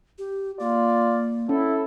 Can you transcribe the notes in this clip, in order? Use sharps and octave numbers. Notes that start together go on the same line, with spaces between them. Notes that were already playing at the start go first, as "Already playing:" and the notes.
G4
A#3 F4 D5
C#4 E4 A4